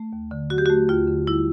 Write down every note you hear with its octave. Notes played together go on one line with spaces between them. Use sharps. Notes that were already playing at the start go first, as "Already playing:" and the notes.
Already playing: A3
D#2
D3
F#3 F#4
G4
F#4
A3
D#2 F4
D3
G3 E4